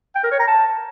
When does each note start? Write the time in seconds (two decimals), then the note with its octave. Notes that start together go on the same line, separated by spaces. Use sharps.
0.16 G5
0.24 A#4
0.32 C#5
0.40 A#5
0.48 A5